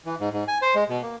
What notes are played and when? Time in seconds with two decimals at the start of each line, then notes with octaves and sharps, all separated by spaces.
0.06 E3
0.20 G#2
0.34 G#2
0.48 G#5
0.62 C5
0.75 G#3
0.89 B2
1.02 A#3